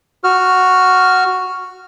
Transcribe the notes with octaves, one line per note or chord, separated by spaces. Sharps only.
F#4 F6